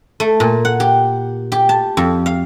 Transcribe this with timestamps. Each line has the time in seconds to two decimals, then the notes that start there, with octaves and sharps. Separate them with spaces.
0.20 A3
0.40 A#2
0.65 F#5
0.80 G4
1.52 G4
1.69 A5
1.97 F2
2.26 F5